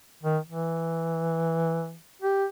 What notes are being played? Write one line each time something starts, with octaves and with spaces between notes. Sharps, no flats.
D#3
E3
G4